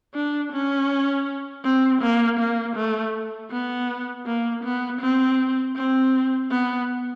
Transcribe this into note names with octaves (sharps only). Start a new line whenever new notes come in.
D4
C#4
C4
A#3
A#3
A3
B3
A#3
B3
C4
C4
B3